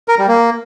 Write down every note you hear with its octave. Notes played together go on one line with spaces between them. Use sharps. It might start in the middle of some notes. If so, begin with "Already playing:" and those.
A#4
G3
A#3